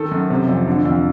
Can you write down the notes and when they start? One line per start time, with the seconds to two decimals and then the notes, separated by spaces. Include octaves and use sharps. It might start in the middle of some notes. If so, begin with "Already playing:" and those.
Already playing: D#3 A4
0.11 F#2
0.30 C3
0.48 F2
0.68 D3
0.85 F2